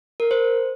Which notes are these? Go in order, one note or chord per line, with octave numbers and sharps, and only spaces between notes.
A#4
C5